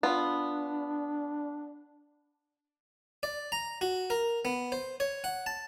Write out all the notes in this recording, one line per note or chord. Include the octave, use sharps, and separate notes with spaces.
B3 D4 F4
D5
A#5
F#4
A#4
B3
C5
C#5
F#5
A5